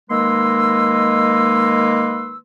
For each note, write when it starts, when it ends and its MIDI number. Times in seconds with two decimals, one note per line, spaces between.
0.10 2.36 51
0.10 2.36 56
0.10 2.36 58
0.10 2.36 71
0.10 2.36 84
0.10 2.36 88